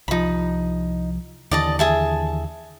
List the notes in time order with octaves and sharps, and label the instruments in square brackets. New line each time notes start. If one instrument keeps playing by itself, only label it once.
[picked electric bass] C2 F3 [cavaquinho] D#4 B5
[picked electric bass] D#2 D3 E3 [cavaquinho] D5 D#5 A5
[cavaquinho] G#4 E5 A5